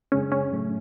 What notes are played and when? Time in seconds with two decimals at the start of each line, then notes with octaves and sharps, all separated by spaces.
0.12 F#2 C#3 G#3 C#4 D4 G#4
0.32 C#4
0.51 A2 F#3 A3 C#4